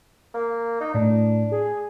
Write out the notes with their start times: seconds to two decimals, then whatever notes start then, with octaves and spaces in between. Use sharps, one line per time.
0.34 A#3
0.80 D#4
0.94 A2 D4
1.52 G#4